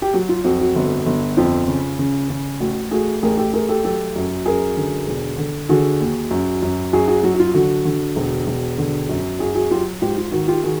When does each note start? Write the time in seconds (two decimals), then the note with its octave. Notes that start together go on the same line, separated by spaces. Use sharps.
0.02 G4
0.13 F#3 F#4
0.29 F4
0.44 F2 F#4
0.61 F#4
0.75 G1
1.06 G1
1.37 F2 F4
1.68 C#3
1.99 C#3
2.30 C#3
2.60 A1 F#4
2.91 A3 F#4 G#4
3.23 A1 G#4 A#4
3.37 G4 A4
3.53 A3 G#4 A#4
3.68 G4 A4
3.84 F#3 G4 A4
4.16 F#2
4.46 F#2 G#4 A#4
4.77 D3
5.07 E1
5.38 D3
5.69 D3 F#4 G#4
6.00 D#2
6.31 F#2
6.62 F#2
6.93 F#2 F#4 G#4
7.08 F#4 G#4
7.23 F#3 F#4
7.34 F#4
7.40 F4
7.54 D3 F#4
7.85 D3
8.16 E1
8.47 E1
8.78 D3
9.09 F#2
9.39 F#2 F#4 G#4
9.55 F#4 G#4
9.71 F#3 F4 G4
10.02 G#2 F4 G4
10.17 F4
10.32 D#3 F#4
10.48 F4 G4
10.63 D#3 F#4 G#4